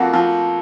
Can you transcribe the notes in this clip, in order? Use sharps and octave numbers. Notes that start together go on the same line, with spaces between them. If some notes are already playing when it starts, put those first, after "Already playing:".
Already playing: F2 F3 A#3 F#4
F3